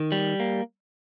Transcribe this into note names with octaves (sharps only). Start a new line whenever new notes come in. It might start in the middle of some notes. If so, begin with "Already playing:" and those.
Already playing: D#3
G3
A#3